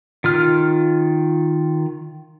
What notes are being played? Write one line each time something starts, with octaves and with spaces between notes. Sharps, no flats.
D#3 F4 F6